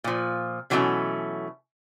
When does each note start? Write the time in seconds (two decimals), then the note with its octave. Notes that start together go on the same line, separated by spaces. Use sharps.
0.04 A#2 F3
0.70 B2 E3 F#3 G3 A3 C#4